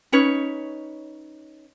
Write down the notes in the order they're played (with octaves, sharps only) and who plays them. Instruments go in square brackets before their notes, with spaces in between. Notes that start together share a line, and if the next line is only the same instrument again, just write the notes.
[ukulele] C#4 D#4 B4 C#5